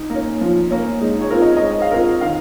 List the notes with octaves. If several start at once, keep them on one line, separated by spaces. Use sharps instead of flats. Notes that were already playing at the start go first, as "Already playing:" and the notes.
Already playing: D#4
A#3
C#4
F3
A#3 C#4
G#3 D#4
C#5
C4 F4 A#4
D#5
D#5
G#3 C#5
F5
C4 F4 A#4
D#3 F5